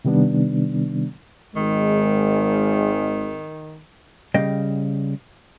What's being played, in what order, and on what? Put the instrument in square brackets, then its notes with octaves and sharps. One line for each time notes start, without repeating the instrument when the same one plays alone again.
[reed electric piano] C3 D#3 G3 B3 D4
[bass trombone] G#1 [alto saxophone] D#3 [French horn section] G#3
[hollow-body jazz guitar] C#3 G3 D#5 F5 G5